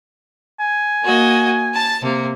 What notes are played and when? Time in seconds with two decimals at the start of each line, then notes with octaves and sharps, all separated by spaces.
0.60 G#5
1.03 A#3 F#4 D#5
1.74 A5 A6
2.02 C3 A#3